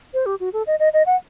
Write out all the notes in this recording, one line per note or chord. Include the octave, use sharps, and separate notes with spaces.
C5
G4
F#4
A4
D#5
D#5
D#5
F#5